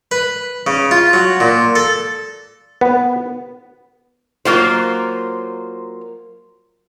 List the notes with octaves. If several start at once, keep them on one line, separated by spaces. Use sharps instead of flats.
B4
C#3
F4
F#3
A#2
A4
B3
F#3 A#3 F4 C5